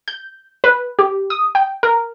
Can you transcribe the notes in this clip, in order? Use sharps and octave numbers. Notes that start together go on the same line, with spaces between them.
G6
B4
G4
D#6
G5
A#4